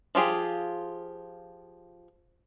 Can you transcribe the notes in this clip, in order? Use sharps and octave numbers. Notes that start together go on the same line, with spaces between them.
F3 F4 G4 G#4